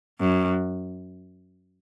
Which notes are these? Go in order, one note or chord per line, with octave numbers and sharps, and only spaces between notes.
F#2